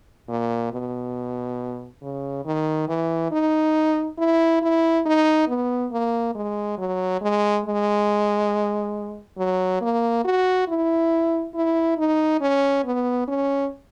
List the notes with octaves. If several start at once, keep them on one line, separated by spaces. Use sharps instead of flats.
A#2
B2
C#3
D#3
E3
D#4
E4
E4
D#4
B3
A#3
G#3
F#3
G#3
G#3
F#3
A#3
F#4
E4
E4
D#4
C#4
B3
C#4